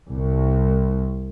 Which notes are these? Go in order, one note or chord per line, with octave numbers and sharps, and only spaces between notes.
C2